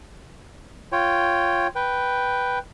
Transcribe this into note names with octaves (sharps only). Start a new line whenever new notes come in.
F4 C#5 G5
B4 G5